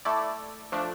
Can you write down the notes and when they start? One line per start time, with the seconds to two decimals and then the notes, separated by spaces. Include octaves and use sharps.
0.05 A3 E4 A4 D5
0.72 F3 A3 D4